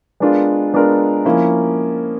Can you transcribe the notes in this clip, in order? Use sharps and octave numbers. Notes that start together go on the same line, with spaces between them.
G#3 B3 D4 F4 A#4
G#3 B3 D4 F4 A#4
F3 A#3 C#4 E4